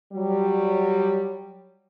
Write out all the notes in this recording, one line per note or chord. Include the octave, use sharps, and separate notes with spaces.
F#3 G3